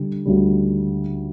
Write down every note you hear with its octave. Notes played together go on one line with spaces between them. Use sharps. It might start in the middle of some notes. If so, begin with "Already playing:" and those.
Already playing: D3 G3
D2 D3 G3